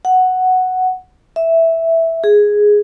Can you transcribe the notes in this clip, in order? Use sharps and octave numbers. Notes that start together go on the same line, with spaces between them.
F#5
E5
G#4